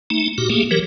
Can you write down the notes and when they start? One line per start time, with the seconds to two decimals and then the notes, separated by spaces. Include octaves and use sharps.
0.10 A3 D#4
0.38 A#2 F#4 G4
0.50 A3 A#3 G4 G#4
0.71 E3 F#3 G4 A#4